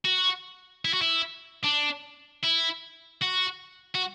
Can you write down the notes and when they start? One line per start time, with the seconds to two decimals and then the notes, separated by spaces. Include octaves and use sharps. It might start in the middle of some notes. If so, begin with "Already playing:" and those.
0.05 F#4
0.85 E4
0.93 F#4
1.02 E4
1.64 D4
2.44 E4
3.22 F#4
3.95 F#4